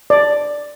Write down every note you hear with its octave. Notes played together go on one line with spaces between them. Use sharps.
D5